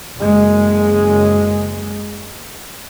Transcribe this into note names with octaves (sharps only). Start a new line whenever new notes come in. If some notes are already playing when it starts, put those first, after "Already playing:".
F#1 G#3